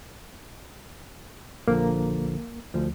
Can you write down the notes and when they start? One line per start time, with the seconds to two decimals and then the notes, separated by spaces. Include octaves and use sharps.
1.68 A#1 D3 F3 A#3
2.74 D2 F3